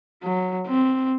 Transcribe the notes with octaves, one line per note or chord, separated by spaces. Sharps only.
F#3
C4